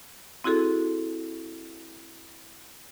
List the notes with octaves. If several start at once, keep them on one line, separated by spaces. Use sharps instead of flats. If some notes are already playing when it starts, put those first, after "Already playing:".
C4 E4 F#4 G#4 A4